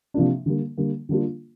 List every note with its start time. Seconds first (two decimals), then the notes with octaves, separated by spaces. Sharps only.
0.14 C3 F3 A#3 D4
0.46 D3 G3 A#3
0.78 D3 G3 A#3
1.09 D3 G3 A#3 D4 F4